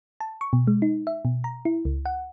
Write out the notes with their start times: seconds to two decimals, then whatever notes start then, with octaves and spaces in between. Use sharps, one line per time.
0.20 A5
0.41 C#6
0.53 B2
0.67 G#3
0.82 D#4
1.07 E5
1.25 B2
1.44 A#5
1.65 E4
1.85 C#2
2.06 F#5